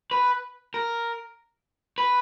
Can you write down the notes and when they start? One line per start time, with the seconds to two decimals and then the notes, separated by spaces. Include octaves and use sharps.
0.11 B4
0.74 A#4
1.98 B4